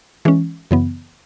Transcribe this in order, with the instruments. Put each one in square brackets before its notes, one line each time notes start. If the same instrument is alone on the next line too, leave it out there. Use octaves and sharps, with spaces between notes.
[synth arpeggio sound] E3 G#3 C#4
F#2 C#3 E3 B3